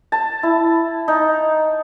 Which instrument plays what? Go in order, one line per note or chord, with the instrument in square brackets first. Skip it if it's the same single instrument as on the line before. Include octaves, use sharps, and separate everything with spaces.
[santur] A5
E4
D#4